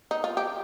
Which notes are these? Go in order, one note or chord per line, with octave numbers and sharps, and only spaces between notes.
D#4
F4
G4